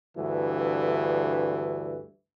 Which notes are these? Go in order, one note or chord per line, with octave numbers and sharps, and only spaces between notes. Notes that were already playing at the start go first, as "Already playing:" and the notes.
D2 G2 E3